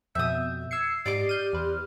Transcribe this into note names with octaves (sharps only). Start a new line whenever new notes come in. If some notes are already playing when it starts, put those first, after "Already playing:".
F2 B2 E5 D#6 G6
E6 G#6 C7 C#7
G#2 G4 D5 D#5 D6
F6 G6 D#7
E2 B4 C5